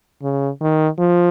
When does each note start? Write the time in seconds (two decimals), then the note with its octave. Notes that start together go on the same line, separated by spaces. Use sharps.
0.22 C#3
0.61 D#3
0.99 F3